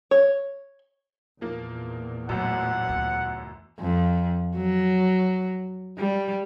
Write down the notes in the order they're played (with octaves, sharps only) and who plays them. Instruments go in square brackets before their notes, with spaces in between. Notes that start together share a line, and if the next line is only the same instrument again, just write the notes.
[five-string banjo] C#5
[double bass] E2 A#2 [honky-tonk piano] F3 A#3
[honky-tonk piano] G1 F#2 [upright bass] A2 [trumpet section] F#5
[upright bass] F#1 D2
[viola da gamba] F2
F#3
G3